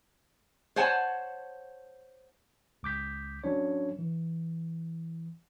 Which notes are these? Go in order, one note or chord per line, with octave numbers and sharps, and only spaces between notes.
C5 C#5 F#5 G#5 A5
C#2 D6 G6 B6
F#3 C#4 D4 C#5
E3